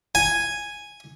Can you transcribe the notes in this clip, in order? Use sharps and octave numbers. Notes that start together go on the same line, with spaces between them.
G#5